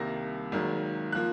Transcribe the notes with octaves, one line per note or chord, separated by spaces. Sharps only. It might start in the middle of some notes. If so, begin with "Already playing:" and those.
Already playing: C2 C3 D#3 A#3 A#6
G#1 G#2 D#3 F#3 A#3
F3 A#3 F#6